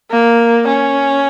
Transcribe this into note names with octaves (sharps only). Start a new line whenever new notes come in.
A#3
C#4